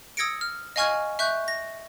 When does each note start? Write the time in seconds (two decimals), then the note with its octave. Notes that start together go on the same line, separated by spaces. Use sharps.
0.17 D#6 E6 G#6 A#6 C#7 D7
0.41 F6
0.76 D#5 F5 G#5 C#6 F6 G#6
1.19 E5 C#6 F#6 G6
1.48 A#6